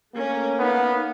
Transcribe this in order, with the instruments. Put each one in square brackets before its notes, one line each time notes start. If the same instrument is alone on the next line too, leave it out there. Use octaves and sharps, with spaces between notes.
[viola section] A3 C#4 A#4 [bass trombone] A#3
[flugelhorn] B3 [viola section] D#4 F5